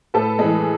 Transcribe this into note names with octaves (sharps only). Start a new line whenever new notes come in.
A2 A4 B4
E3 G#3 A4